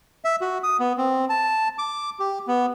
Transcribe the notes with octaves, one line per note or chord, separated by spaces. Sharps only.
E5
F#4
D#6
B3
C4
A5
D6
G4
B3